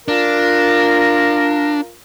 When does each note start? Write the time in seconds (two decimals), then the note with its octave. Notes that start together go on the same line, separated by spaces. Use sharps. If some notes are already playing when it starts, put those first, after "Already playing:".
0.08 D4 F4 A#4